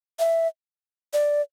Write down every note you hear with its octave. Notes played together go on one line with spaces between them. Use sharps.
E5
D5